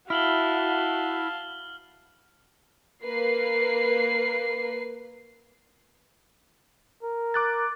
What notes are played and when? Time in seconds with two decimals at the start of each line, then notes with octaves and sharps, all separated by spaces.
0.10 E4 F#4 F5 A5 F6 F#7 G7
3.03 A#3 A#4 B4 C7
7.03 A#4
7.34 D6 F#6 A6